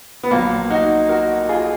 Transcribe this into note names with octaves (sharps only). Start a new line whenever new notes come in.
B3
A#1 A#2 F#3 A#3
D#4 F#4
F#4 A#4
F4 G#4